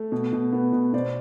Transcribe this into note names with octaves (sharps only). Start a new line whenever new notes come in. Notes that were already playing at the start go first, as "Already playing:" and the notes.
Already playing: A3
B2
B2
B3
B2
B2 C5 D5